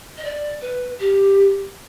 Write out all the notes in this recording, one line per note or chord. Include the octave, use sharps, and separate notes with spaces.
D#5
D5
B4
G4